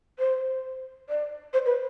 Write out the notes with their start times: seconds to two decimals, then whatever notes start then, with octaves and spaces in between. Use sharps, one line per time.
0.19 C5
1.09 D5
1.53 C5
1.66 B4